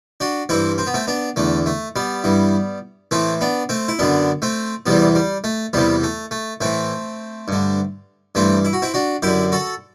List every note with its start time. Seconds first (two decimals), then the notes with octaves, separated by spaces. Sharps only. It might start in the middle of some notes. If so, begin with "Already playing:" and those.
0.20 D4 F#4
0.49 G2 E3 C4 E4
0.78 C4
0.87 B3
0.94 A3 C4
1.07 B3 D4
1.36 E2 D3 A3
1.66 A3
1.96 G3 B3
2.24 G2 E3
3.11 A2 E3 A3 C4
3.41 B3 D4
3.69 A3 C4
3.88 E4
3.99 F#2 D3 B3 D4
4.42 A3 C4
4.86 E2 C3 E3 G3 B3
5.15 G3
5.44 A3
5.73 E2 C3 E3 G3 B3
6.03 A3
6.31 A3
6.61 A2 E3 A3 C4
7.48 G2 D3
8.35 G2 E3 A3 C4
8.65 E4
8.73 F#4
8.82 C4 E4
8.94 D4 F#4
9.22 F#2 D3 E4 G4
9.52 F#4 A4